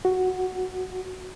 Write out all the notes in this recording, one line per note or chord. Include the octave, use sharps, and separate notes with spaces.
F#4